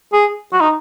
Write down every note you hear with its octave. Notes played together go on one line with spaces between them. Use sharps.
G#4
F#4
D#4